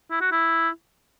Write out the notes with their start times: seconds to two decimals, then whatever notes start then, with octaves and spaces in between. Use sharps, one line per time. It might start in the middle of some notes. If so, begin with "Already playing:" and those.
0.11 E4
0.21 F#4
0.32 E4